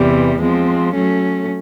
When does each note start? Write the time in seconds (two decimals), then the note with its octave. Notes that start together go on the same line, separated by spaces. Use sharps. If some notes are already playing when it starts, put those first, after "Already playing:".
Already playing: E2 C3 E3 G3
0.41 F3 G#3 C4
0.94 F#3 A3 C#4